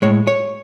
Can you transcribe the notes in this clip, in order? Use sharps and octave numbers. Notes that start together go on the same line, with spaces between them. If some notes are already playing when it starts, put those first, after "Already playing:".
A2 G#3 C#5
C#5